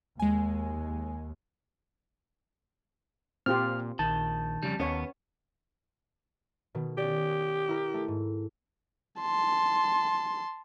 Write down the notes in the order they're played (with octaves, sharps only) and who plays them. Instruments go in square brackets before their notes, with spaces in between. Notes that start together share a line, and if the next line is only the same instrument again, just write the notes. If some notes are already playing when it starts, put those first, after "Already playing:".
[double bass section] D#2 [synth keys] G#3 G#5
[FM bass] A#2 [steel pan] C4 F4 G4 [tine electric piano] F6
[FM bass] A#1 [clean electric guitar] D#3 [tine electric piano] A5
[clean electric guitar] F2 G3 [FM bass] C#3
[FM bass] D#2 [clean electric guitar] B3 [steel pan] C#4 C#5
[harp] B2 D#3
[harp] C#4 D5 [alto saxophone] G4
[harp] E4 A#4
A3
G#2
[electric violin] A5 C6